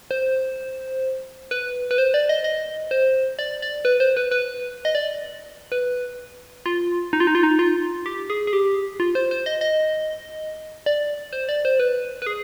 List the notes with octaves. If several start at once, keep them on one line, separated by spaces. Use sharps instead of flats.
C5
B4
B4
C5
D5
D#5
D#5
C5
D5
D5
B4
C5
B4
B4
D#5
D5
B4
F4
D#4
F4
D#4
F4
D#4
F4
G4
G#4
G#4
G4
F4
C5
C5
D#5
D#5
D5
C5
D5
C5
B4
B4
G#4